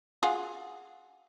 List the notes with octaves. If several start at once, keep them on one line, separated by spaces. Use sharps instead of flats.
F4 F#4 G#4